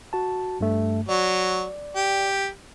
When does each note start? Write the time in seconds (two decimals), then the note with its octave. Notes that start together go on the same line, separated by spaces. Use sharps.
0.13 F#4 A5
0.61 G2 A3
1.09 F#3 D5
1.96 G4